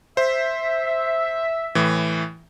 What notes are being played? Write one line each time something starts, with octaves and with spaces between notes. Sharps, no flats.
C5 E5
A2 E3